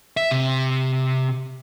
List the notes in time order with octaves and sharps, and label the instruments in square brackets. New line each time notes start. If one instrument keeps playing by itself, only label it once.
[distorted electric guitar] E5
C3